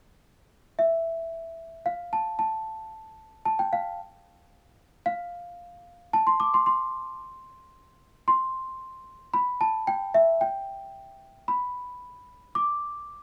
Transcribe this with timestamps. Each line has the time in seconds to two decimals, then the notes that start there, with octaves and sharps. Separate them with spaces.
0.79 E5
1.86 F5
2.13 A5
2.39 A5
3.45 A5
3.59 G5
3.73 F5
5.06 F5
6.13 A5
6.27 C6
6.40 D6
6.54 C6
6.66 C6
8.28 C6
9.34 B5
9.61 A5
9.87 G5
10.14 E5
10.41 G5
11.48 B5
12.55 D6